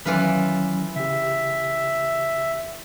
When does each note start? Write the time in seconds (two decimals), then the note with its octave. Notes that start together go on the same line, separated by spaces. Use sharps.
0.05 D#3 E3 F#3 C#4 F4 B4
0.96 C#3 G4 E5